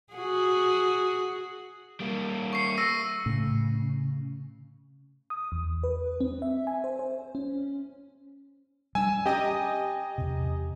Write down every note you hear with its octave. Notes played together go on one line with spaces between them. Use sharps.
F#4 G#4
G3 A#3
C#6 C7 C#7
E6 A#6 D#7
A2 C#3
D#6
E2
B4
C4
E5
G#5
C5
C5
C#4
G3 D4 G#5 E6
C#4 G4 D#5 G5 A#5
E2 C3